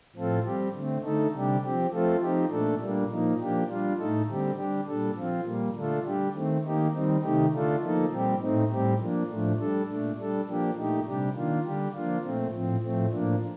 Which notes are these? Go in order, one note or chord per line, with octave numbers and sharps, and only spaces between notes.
A2 F3 C4 F4 A4
G3 C4 G4
D3 A3 C4
D3 A3 D#4 A4
C3 G3 D4 G4
F3 C4 G4
F3 A3 C4 F4 A4
F3 C4 D#4 G4
A#2 A3 D4 A4
A#2 G3 A#3 D4
A#2 F3 A#3 D#4
F3 A#3 D4 G4
G3 D4 F4
A2 A3 D#4 A4
D3 G3 C4 G4
G3 D4 G4
A#2 G3 D4 A4
F3 C4 F4
A#2 G3 A#3
D3 A3 D4 F4 A4
G3 D4 G4
D#3 A3 C4
D#3 A#3 D#4 G4
D#3 G3 C4 D#4
C3 D#3 A3 D#4 G4
D3 A3 D4 F4 A4
F3 A#3 D#4 A4
A#2 G3 C4 G4
A2 A3 C4 D#4
A2 G3 C4 G4
F3 A#3 D4
A2 F3 A3 D4
G3 D4 A4
A#2 A3 D4
G3 D4 A4
F3 A#3 D4 G4
A#2 A3 D#4 G4
C3 G3 D4 G4
D#3 A#3 D4 F4
D3 G3 D4 G4
F3 A#3 D4 F4
A#2 A3 C4
A2 F3 C4
A2 F3 A3 C4
A2 F3 A#3 D4